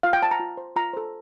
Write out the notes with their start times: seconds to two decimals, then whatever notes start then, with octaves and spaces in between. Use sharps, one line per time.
0.03 F4 F5
0.13 G5
0.22 C5 A5
0.31 A#5
0.40 F4
0.57 C5
0.76 F4 A#5
0.93 A4 C5